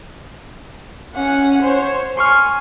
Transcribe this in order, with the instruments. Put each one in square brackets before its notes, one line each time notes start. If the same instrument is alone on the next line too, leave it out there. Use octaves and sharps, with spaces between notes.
[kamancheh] C#4 F#5
C5 C#5
[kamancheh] G#5 [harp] C6 C#6 F6